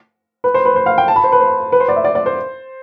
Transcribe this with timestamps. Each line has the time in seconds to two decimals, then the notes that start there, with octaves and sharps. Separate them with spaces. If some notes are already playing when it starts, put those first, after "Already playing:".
0.44 B4
0.54 C5
0.65 B4
0.76 C5
0.86 F5
0.98 G5
1.08 A5
1.16 B5
1.24 C5
1.32 B4
1.40 C5
1.72 B4
1.80 C5
1.88 D5
1.96 E5
2.04 D5
2.15 D5
2.26 C5